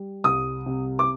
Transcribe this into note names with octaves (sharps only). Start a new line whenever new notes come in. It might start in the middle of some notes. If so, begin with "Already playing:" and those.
Already playing: G3
C2 D#6
C3
D6